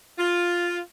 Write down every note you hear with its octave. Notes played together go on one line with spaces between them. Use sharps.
F4